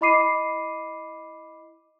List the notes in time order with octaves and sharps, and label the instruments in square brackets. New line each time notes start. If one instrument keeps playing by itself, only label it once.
[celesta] E4 D#5 B5 D6 C7 D#7